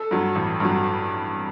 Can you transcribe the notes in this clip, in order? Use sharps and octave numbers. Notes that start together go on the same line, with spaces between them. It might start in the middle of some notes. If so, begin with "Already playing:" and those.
Already playing: A4
G2 F#3
A1
G2 F#3